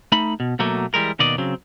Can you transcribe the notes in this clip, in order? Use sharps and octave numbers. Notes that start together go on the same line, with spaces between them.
A3 D#4 B5
B2
B2 F#3 A3 A#3
E3 G3 G#3 A#4
D#2 B2 D#3 D5 D#5
C#3 F#3 C4